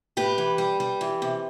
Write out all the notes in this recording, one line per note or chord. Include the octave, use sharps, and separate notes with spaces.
A2 G4 B4
E3
G3
G3
E3
C3